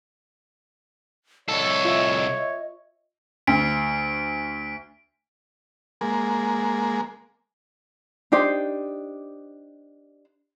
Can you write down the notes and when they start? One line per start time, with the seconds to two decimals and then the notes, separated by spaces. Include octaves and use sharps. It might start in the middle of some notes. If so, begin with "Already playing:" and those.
1.49 C2 A4 C#5 D#5
1.85 F4 E5
3.47 D2 B6 D7
6.01 G#3 A#3
8.32 D4 D#4 G4 C5